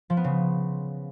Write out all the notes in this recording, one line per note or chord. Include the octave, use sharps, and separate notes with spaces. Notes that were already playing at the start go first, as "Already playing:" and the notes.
F3
B3
C#3